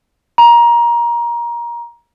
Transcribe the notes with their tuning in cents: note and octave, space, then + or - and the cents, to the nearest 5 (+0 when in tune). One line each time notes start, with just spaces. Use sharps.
A#5 +20